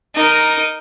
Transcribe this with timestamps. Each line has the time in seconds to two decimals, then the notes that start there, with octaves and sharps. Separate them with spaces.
0.16 D#4 A#4